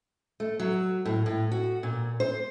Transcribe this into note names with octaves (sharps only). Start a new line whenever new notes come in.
A3
F#3
A2
A2
F#4
A#2
C5